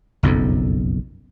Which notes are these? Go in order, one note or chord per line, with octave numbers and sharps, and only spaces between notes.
F#1 B1 F2